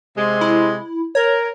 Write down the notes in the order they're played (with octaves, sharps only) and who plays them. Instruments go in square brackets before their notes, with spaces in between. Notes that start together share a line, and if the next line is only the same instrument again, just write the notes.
[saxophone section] C3 G#3
[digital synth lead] E4
[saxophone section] A#4 [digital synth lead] C#5